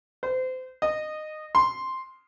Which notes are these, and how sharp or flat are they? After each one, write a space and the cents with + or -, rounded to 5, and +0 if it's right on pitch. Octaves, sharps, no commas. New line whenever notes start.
C5 -30
D#5 -15
C6 +0